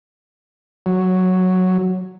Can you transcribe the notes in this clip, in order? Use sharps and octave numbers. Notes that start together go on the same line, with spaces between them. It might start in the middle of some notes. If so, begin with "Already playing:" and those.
F#3